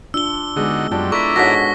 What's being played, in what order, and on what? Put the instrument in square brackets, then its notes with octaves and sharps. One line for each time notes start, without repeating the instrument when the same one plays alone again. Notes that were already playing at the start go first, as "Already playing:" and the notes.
[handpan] D4 F4 [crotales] E6 G7
[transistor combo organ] D3 D#4 F#4 [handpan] G#3 B3 G#4
[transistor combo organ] F#2 G3 [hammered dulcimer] D4 [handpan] F4
[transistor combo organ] E4 D5 A#5 [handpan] A4 [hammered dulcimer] B4 [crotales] C#6 B6
[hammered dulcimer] G#2 A4 F#5 [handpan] F#4 C#5 [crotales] A#6 B6